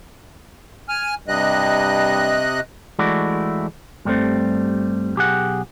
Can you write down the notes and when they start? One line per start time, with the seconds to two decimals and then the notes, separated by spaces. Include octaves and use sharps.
0.89 G#5 F6
1.28 G2 C3 D#5 F#6
2.99 E3 G#3 A3 E4 F#4 D5
4.05 G2 G3 A3 C4
5.16 B1 G4 G#4 F#5